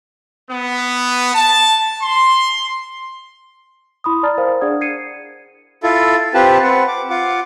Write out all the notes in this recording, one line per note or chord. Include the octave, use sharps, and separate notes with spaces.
B3
A5
C6
E4 B5 C6 D#6
D5 A5 A#5 F6 A6
A#4 C5 F5 G5
D4 G#4 D5 F#5 D#6 G#6
G#6 C7 C#7 D#7
E4 F4 A4
C4 F4 G4 B4 A5
C4 B4 F#5
D6
F4 F#5 D6